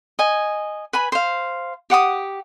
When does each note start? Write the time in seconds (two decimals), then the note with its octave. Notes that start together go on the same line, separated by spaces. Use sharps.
0.19 D#5 G#5
0.93 B4 G#5 B5
1.12 C5 F5
1.90 G4 F#5 D6 D#6